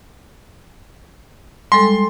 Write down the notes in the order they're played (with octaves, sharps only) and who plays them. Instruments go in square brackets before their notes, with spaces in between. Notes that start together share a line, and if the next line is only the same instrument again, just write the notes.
[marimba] G3 G#3 A4 [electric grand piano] C6